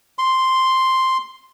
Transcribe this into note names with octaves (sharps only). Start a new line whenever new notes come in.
C6